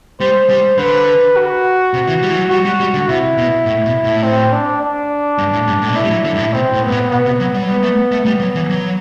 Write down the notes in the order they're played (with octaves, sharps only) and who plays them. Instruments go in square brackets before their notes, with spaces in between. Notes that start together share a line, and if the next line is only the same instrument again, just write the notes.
[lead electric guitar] G3 [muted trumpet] C5
[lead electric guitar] G3
[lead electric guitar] D3 [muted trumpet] B4
[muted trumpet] F#4
[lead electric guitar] C3
E3
G3
E3
F#3
[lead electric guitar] G3 [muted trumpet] F#4
[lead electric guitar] G3
G3
D3
[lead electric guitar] C3 [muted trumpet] E4
[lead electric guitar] B2
A2
B2
A2
[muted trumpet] C4
D4
D4
[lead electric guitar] G2
A2
G2
A2
B2
[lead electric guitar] A2 [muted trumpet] E4
[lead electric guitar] G3
F#3
D3
G2
A2
[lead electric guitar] B2 [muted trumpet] C4
[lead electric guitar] A2
[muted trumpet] B3
[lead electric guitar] G2
A2
[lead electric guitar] B2 [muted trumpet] B3
[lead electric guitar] C3
F#3
G3
F#3
[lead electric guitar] G3 [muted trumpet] B3
[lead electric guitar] A3
A3
[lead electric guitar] G3 [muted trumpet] B3
[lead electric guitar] F#3
E3
F#3